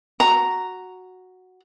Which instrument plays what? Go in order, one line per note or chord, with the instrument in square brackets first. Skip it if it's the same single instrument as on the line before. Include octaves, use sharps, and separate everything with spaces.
[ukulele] F#4 A#5